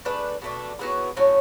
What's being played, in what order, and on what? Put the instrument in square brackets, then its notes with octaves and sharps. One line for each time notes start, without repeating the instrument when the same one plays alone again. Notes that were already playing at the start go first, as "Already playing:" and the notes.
[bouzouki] A3 D4 G#4 B4
B2 A3 D4
F#3 B3 E4 G#4
A2 F#3 C#4